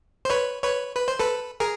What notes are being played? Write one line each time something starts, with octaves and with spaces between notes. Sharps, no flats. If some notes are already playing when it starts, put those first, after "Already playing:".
C5
B4 C#5
B4 C#5
B4
C5
A4 B4
G#4 A#4